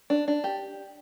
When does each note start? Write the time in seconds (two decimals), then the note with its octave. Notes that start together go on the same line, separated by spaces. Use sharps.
0.10 D4
0.28 D4
0.44 G4